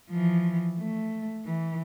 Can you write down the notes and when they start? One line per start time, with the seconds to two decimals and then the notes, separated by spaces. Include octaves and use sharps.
0.10 E3 F3
0.79 A3
1.46 E3